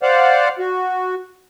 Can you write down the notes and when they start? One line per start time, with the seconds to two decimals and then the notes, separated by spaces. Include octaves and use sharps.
0.03 C5 D5 F5 F#5
0.59 F#4